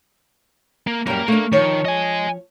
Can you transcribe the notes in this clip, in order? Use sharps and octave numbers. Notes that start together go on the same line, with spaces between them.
A#3
F#2 G3 A#3 A#4
A3 A#3 D4
D#3 F3 C#5
D#5 G#5